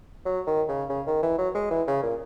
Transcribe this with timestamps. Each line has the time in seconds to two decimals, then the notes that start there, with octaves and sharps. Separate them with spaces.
0.25 F#3
0.47 D#3
0.69 C#3
0.90 C#3
1.07 D#3
1.23 E3
1.38 F#3
1.55 G#3
1.71 E3
1.88 C#3
2.03 A#2